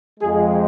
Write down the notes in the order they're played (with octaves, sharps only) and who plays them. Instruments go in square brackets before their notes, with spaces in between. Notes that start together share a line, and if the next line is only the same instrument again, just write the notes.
[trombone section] F2 F3 G#3 G#4